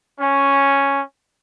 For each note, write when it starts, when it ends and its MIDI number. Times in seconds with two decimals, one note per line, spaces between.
0.19 1.01 61